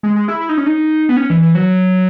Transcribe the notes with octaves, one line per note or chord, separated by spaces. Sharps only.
G#3
G#3
E4
E4
D#4
C#4
D#4
B3
C#4
E3
E3
F#3